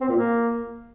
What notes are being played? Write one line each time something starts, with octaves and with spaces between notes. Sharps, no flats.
C4
A#2
A#3